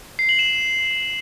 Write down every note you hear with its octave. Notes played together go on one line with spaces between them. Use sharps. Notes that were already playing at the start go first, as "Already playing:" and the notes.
C7
F#7
E7
E7